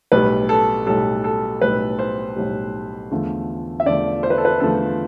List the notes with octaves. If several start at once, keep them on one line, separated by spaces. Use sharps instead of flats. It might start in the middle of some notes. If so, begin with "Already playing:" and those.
B1 A2 G3 B4
A4
B1 A2 G3 A4
A4
B1 A2 G3 B4
C5
B1 A2 G3
E2 D3 F3 A3
E5
E2 D3 F3 A3 D5
C5
B4
A4
B4
E2 D3 F3 A3 A4